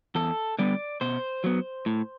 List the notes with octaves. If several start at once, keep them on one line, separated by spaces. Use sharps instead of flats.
E2 A4
D3 G3 B3 D5
B2 C5
F#3 B3
A2